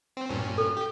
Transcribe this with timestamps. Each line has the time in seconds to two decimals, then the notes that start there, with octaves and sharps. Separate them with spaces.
0.17 C4
0.29 G2 A#2 C#4
0.58 A4
0.77 G4